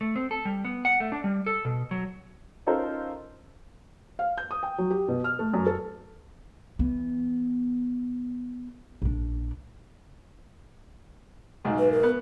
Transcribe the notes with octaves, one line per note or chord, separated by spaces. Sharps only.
A3
C4
A4
G3
B3
F#5
A3
D4
G3
A4
B2
F#3
C#4 D#4 F4 A4 A#4 C5
F5
G6
D#6
G5
F#3
G4
B2
F6
A3
F#2
A4
E3 B3
A#1 D4
B1 G#2
B4
A#4
B3